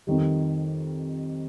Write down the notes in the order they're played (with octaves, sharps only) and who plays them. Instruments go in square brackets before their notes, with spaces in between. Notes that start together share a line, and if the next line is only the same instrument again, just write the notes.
[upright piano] F2 D#3 G3